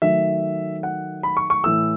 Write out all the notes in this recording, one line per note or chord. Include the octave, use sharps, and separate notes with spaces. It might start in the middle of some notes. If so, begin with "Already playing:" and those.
D#3 F#3 A3 E5
F#5
B5
C#6
C#6
A2 E3 A3 E6